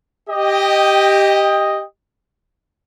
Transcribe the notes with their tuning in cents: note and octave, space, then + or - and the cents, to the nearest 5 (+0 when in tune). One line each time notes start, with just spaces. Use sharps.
G4 +0 D#5 +0 G5 +25